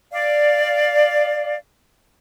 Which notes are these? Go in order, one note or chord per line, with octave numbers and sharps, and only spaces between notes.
D5 F5